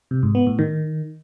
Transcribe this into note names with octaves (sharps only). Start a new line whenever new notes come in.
C3
G#2
B3
A2
D#3